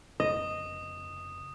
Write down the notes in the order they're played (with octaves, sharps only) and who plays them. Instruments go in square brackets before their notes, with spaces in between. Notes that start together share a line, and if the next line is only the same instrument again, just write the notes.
[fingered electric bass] F1 C#3 B3 [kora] D#5 [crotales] D#6